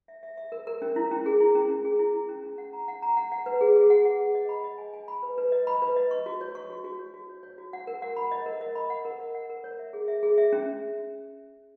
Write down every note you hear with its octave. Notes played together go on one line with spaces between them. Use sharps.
E5
E5
E5
A#4
A#4
C#4
E4
C#4
G#4
E4
C#4
C#4
G#4
E4
E4
C#4
C#4
F#5
A#5
F#5
A#5
F#5
F#5
B4
G#4
G#4
F#5
F#5
G#4
D#5
B5
D#5
G#5
G#5
B5
B4
B4
D#5
B5
B4
D#5
C#6
F#4
C#5
C#6
F#4
F#4
C#5
F#4
C#5
C#5
F#4
F#5
A#4
F#5
B5
D#5
A#4
D#5
B5
F#5
A#4
F#5
F#5
A#4
C#5
E5
G#4
E5
G#4
E5
C#4